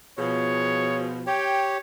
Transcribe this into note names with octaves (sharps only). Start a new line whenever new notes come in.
B2 F3 G#4 C#5
G4 C#5 G5